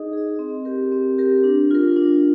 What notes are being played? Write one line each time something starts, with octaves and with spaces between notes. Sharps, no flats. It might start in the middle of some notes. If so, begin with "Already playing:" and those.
Already playing: D#4 G#4 D#5
G#4 D#5
C4
G4 A#4
C4
G4 A#4
D4
F4 A#4
D4